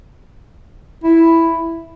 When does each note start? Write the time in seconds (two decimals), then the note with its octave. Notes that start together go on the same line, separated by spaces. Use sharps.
1.04 E4